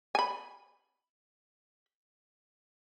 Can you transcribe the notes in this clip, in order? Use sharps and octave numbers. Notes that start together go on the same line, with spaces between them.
G#5 B5